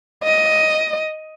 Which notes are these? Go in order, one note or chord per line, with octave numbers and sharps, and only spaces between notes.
D#5